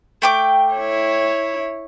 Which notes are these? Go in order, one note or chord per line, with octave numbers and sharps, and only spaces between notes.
A3 G5 D6
E4 C#5